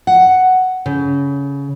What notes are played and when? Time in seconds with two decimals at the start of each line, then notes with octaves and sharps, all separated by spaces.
0.07 F#5
0.86 C#3